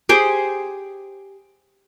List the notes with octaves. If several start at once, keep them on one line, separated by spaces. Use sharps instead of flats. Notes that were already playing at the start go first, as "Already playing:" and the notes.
G4 G#4 C5